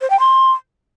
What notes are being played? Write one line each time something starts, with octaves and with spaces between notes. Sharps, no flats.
C5
G5
C6